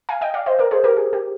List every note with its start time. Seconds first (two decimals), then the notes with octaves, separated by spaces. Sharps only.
0.09 F5 G#5
0.21 D#5 G5
0.34 D5 F5
0.46 C5 D#5
0.59 A#4 D5
0.71 G#4 C5
0.84 G4 A#4
0.97 G#4
1.13 G4